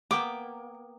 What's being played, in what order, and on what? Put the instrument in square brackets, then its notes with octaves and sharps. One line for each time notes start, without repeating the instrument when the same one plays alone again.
[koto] A#3 B3 G5 [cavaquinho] D6